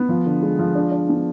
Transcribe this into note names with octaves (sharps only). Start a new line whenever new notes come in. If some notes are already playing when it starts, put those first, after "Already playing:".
Already playing: B3
F3
D3
G#3
F3
D4
D4
B3